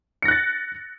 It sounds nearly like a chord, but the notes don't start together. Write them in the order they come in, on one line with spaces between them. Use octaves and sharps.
C#7 A#6 F#6 A6